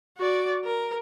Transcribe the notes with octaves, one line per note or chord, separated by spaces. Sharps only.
F#4 D5
A#4